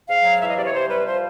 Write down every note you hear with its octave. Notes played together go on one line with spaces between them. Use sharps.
G#2 F5
F#3
E3 E5
D#5
C3 D5
C#5
C3 C5
G3 B4
F3 C5